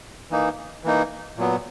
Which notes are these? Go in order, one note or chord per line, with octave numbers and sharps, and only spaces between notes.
E3 A#3 D#4
E3 A#3 D#4
A#2 F#3 B3